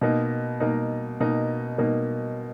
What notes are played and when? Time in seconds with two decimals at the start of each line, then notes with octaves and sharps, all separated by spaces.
0.01 B2 A#3 D#4
0.60 B2 A#3 D#4
1.20 B2 A#3 D#4
1.78 B2 A#3 D#4